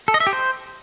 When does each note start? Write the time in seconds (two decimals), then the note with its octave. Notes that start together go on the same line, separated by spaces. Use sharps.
0.08 A4
0.14 D#5
0.20 E5
0.27 G4
0.33 C5